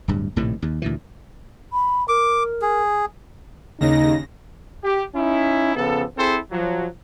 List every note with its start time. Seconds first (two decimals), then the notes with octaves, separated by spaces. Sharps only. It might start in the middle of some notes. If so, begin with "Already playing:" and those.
0.08 D1 G2
0.36 A#1 A2 C3 D#3
0.62 D#2
0.82 D2 A#2 E3
1.71 B5
2.08 A#4 D6
2.62 G#4
3.80 D#2 C#3 D#4 A#6
4.83 G4
5.15 C#4 D#4 E4
5.75 C#3 F3 B3 A4
6.16 C4 E4 G#4 A4 C5
6.51 F3 F#3